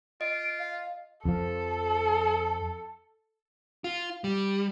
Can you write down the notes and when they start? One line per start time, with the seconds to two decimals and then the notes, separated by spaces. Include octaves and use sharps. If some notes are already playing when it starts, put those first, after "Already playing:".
0.21 F4 D#5 D7
0.59 F5
1.25 F2 F3 A4
3.84 F4
4.24 G3